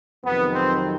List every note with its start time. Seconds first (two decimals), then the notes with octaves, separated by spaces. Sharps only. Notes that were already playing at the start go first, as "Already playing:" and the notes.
0.25 F2 C3 D#3 F#3 B3
0.53 C4